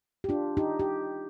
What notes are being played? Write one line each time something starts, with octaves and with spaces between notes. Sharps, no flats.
G4
D4 F4
D#4 G4
G4